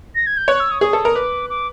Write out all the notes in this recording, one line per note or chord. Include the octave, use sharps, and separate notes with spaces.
A#6
G#6
G6
C#5 F#6
E6
D#6
G#4 D#6
A4
A#4
B4 D6
D6